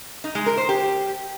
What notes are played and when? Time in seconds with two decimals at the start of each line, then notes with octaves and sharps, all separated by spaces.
0.24 D#4
0.35 G#3
0.46 A#4
0.58 C5
0.69 G4